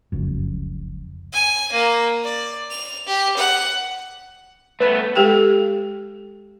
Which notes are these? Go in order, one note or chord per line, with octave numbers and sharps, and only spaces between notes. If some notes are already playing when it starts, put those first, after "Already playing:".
F1 C#2 F#2
G#5
A#3
D5
F7
G4
F#5
A3 B3 B4
G#3 G4 A4 G5